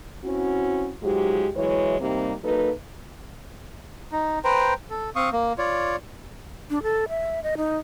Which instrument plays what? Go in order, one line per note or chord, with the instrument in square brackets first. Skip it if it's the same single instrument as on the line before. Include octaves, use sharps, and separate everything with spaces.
[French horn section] C4 C#4 E4 F#4
G#2 F#3 G#3 F4 G4
E3 F#3 G#3 E4 C#5
C3 G3 A#3 C4 D#4 G4
F#3 A#3 D#4 A4 B4
[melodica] D#4
B4 C5 G5 A#5
A4
C4 F5 C#6 D#6
A#3
F4 C#5 D5
[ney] D4
A4
E5
D#5
D#4